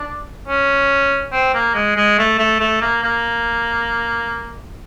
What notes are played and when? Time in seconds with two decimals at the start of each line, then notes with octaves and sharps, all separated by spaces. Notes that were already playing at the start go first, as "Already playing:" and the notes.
Already playing: D4
0.48 C#4
1.32 C4
1.54 A#3
1.75 G#3
1.96 G#3
2.18 A3
2.39 A3
2.60 A3
2.81 A#3
3.03 A#3